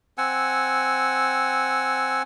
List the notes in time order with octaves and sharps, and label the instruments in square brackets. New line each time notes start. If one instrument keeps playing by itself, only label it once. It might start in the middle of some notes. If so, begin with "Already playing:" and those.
[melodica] C4 F#5 G#5 E6